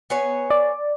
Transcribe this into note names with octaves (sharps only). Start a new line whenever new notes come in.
B3 G#4 C#5
D5